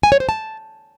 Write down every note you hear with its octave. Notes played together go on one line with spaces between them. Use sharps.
G#5
C#5
C5
A5